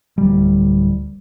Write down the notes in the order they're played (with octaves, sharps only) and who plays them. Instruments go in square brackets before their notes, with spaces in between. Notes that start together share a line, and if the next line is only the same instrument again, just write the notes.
[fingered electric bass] D1 G3